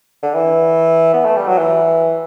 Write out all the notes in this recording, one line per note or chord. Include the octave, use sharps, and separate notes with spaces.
D3
E3
B3
A3
G3
F#3
E3